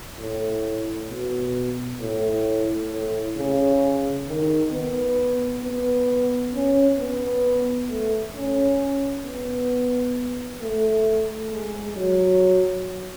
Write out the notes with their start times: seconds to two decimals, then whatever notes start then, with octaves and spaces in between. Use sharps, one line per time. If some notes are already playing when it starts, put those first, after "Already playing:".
0.19 A2
1.09 B2
2.00 A2
2.90 A2
3.36 C#3
4.27 D#3
4.72 B3
5.63 B3
6.53 C#4
6.98 B3
7.89 A3
8.35 C#4
9.25 B3
10.61 A3
11.52 G#3
11.97 F#3